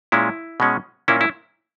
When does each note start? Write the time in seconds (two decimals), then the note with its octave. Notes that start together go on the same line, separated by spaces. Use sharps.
0.12 A#2 G#3 C#4 E4
0.60 B2 G#3 C#4
1.08 A#2 A#3 C#4 E4
1.21 E4